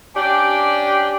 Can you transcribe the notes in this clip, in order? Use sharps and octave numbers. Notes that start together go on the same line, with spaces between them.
C#4 D4 G4